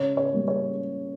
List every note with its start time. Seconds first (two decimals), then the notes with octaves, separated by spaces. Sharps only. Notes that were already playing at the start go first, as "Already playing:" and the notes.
Already playing: C#3 C#5
0.17 C#5
0.33 G3 A#3
0.48 C#5